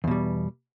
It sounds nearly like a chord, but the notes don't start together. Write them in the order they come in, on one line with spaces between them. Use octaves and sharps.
E2 B2 G3